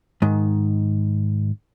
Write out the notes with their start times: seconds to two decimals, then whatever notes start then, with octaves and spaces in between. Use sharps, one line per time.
0.22 G#2 D#3